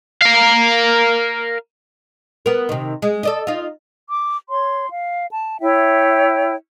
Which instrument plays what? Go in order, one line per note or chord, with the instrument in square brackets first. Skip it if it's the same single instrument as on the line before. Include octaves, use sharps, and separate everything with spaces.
[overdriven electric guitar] A#4 F5
[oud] B3 A#4
C3 D#3
G#3
A4 D5 D#5
D#4 F4
[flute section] D6
C#5 C6
F5
A5
E4 C#5 E5 G5